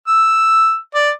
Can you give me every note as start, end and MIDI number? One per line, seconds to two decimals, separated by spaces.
0.07 0.76 88
0.95 1.10 74